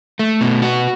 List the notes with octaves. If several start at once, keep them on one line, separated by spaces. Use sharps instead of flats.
A3
B2
F#4